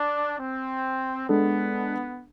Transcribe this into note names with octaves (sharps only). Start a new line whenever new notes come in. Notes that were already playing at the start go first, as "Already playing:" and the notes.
Already playing: D4
C4
G#3 B3 D4 A4